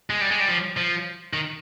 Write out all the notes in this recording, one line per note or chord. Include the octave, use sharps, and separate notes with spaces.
G#3
G3
G#3
G3
F3
F3
D#3